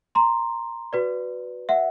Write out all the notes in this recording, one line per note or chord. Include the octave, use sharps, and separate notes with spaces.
A#5 C6
F#4 B4 D5
E5 F#5